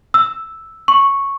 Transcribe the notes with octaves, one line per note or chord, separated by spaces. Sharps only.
E6
C#6